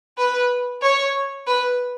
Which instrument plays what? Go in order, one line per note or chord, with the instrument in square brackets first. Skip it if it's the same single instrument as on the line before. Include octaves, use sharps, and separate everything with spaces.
[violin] B4
C#5
B4